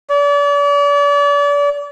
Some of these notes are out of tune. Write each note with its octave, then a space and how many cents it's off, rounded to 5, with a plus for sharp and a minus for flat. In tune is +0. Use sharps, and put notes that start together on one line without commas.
D5 -40